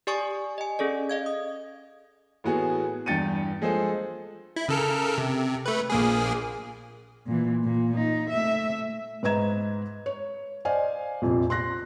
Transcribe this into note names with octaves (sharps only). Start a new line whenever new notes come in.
G4 D5 G#5 C#6 D#6
D#5 G#5
C#4 G#4 A4 D5
D#5 F5 G#6
D#6
A2 E3 B3 F#4 G#4
E2 G2 G5 A6 C#7 D#7
F3 G#3 G#4 A4 C5
E4
C#3 A4 A#4
C3
A3 B4
A#1 A#3 G#4
A#2 E3
A#2
D#4
A3 E5
G#2 B4 D#5 A#5 G#6 E7
C#5
C5 D5 D#5 F5 G#5
A#1 F2 C3
C6 F#6 A#6